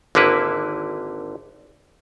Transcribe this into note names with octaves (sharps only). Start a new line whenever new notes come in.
G#1 D3 A#3 E4 B4